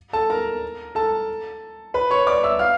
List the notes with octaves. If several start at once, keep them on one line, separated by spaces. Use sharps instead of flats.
A4 A5
A#4 A#5
A4 A5
B4 B5
C#5 C#6
D5 D6
E5 E6
F5 F6